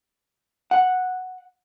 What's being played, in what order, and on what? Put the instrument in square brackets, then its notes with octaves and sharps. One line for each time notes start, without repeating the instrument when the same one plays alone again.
[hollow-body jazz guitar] F#5